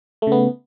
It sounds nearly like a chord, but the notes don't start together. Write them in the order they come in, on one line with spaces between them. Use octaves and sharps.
A3 C#3 B3